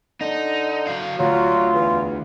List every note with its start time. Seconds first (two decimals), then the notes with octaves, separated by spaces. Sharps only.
0.21 D3 D#4
0.87 F#3 F5
1.19 D2 F#3 F4
1.74 E2